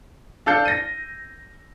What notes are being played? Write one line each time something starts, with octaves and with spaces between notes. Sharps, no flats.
D4 A4 F5 G6
A#6 D#7